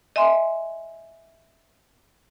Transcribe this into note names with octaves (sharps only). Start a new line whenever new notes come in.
D#5 E5 G#5 C6